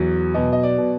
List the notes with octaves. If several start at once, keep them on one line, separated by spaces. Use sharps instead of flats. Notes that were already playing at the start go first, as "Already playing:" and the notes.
Already playing: E2 F#3
B2 D#5
D#5
D5
B2